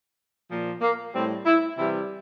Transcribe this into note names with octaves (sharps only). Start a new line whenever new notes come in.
A#2 F3
A#3
A2 G3 C4
E4
C3 E3 G3 E4